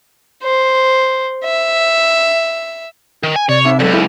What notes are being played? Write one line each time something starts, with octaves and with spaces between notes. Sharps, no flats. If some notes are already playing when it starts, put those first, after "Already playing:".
C5
E5
D#3
G#5
C3 C#5 D5
C4 D#4 E5 D6
C#2 G2 F#3 A4 D5 E7
D#4 E4 G#4